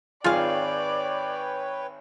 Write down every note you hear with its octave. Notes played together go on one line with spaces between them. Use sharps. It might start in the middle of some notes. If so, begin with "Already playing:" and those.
G#1 F4 G#4 B4 C#5 D5 F5 G5